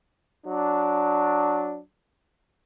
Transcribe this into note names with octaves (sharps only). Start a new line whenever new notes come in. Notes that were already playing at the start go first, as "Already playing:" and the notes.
F#3 D4